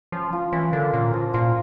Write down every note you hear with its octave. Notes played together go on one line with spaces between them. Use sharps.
F3 C#4
F4
E3 C#4
D3 A#4
A#2 C#4
F3
A#2 F4